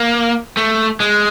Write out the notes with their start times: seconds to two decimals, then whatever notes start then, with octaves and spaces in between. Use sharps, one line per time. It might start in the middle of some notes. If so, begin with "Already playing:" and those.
Already playing: A#3
0.57 A3
1.00 G#3